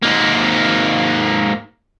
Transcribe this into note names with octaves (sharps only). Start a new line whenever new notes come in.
G#2 A#3